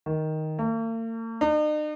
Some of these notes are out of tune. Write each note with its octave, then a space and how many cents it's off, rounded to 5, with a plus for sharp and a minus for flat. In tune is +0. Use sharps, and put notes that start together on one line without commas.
D#3 +5
A#3 -45
D#4 -45